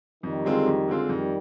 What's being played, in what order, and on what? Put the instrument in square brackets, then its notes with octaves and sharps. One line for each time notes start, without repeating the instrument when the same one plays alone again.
[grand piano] F2 [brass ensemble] D#3 G3
[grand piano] D3 G#3 C4 F4
F2
D3 G#3 C4 F4
[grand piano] F2 [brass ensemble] D#3 G3